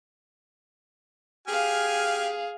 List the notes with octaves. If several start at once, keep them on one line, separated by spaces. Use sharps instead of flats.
G4 G#4 F5 G#5 F6